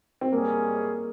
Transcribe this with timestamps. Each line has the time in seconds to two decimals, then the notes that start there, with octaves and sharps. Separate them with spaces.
0.21 C4
0.32 G#2 G3 A#3 C#4 G#4